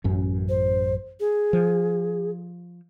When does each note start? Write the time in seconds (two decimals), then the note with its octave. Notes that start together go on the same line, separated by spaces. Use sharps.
0.04 A1 F#2 C#4
0.49 C5
1.20 G#4
1.53 F3